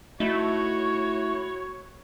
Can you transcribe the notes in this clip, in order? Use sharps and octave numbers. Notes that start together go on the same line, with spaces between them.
A3 D#4 E4 F#4 C#5